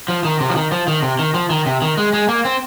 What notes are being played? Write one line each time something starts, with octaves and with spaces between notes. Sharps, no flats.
F3
D#3
C3
F3
D#3
F3
D#3
C3
D#3
F3
D#3
C3
D#3
G#3
G#3
A#3
C4